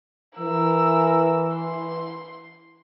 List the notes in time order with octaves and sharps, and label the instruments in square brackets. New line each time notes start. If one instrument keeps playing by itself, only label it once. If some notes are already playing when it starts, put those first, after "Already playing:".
[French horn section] E3 [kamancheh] A#4 E6
[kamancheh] C6